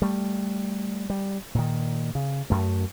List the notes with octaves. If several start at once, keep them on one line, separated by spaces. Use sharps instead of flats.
G3 A3
G3
A#2 D#3
C#3
F#2 A3